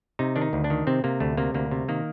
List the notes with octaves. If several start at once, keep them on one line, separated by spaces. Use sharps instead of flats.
C3 D#4
D#3 D4
D#4
D2
D4
D#3
C3 C4
C3 A#3
D2 A3
C3 A#3
D2 A#3
C3
D#3 A#3